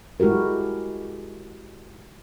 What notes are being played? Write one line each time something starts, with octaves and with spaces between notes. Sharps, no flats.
G#3 E4 F#4 G4 A#4